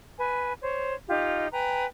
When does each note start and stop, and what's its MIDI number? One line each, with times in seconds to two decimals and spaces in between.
0.18 0.53 71
0.18 0.53 80
0.61 0.93 72
0.61 0.93 73
1.09 1.47 63
1.09 1.47 65
1.09 1.47 67
1.52 1.85 71
1.52 1.85 79
1.52 1.85 80
1.52 1.85 82